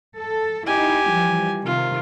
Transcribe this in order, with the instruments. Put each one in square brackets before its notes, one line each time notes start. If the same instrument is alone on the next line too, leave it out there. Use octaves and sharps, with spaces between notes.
[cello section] A4
[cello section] D#4 E4 [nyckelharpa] G4 G#5
[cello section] E3 F3 G3
[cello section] C3 D#3 [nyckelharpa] F4